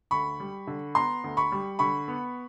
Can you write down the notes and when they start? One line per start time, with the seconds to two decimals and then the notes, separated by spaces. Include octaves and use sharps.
0.11 D2 B5 C#6
0.40 G3
0.67 D3
0.95 B3 A#5 C6
1.24 D2
1.37 B5 C#6
1.52 G3
1.79 D3 B5 C#6
2.08 B3